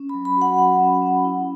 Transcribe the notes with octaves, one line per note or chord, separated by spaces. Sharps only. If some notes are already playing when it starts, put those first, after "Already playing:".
Already playing: C#4
B5
F#3
B5
F#4 F#5
F#3 F#5
C#4
C#4
E4